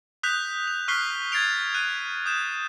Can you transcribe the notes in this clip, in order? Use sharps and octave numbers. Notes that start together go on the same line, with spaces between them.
D#6 F#6 G6 B6 F7
F7
C#6 F6 F#6 B6 C7 G7
G#6 A6 C7 D7 F7
F#6 D#7
D#6 G6 E7